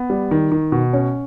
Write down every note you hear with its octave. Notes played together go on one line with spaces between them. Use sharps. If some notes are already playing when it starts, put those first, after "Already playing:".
Already playing: B3
G3
D#3
D#3
B2
C#4